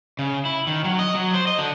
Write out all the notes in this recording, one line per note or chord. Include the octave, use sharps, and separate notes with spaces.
C#3
E4
D#3
F#3
D#5
F#3
C5
D#5
D3